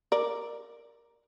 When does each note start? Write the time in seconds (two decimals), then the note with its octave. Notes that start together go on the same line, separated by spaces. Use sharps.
0.12 A#4 D5